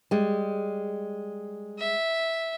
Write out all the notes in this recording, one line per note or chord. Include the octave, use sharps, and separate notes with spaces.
G3 G#3
E5